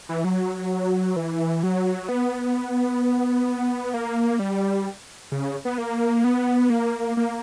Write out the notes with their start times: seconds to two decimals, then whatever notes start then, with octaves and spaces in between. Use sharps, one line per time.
0.09 E3
0.24 F#3
1.16 E3
1.63 F#3
2.09 B3
3.94 A#3
4.39 G3
5.32 C#3
5.65 B3
5.78 A#3
6.24 B3
6.70 A#3
7.17 A#3